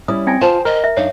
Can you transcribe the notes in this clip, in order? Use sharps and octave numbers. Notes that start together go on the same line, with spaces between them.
G3 C#4 E4 D#6
C4 G5 G#5 G#6 A#6
F4 C5 A5
A#4 D#5
E5
F#2 D4 D#4 C#5 F5